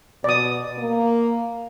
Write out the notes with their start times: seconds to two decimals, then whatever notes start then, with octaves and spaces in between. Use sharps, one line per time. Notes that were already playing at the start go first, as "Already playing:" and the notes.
0.24 B2 D5 D#6
0.78 A#3